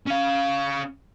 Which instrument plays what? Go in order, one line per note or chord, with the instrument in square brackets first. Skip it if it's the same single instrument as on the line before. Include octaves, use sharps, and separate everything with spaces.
[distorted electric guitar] C#4 F5